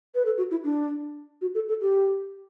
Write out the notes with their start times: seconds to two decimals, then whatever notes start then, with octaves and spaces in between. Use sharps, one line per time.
0.15 B4
0.25 A4
0.38 F#4
0.51 E4
0.64 D4
1.41 F#4
1.55 A4
1.69 A4
1.81 G4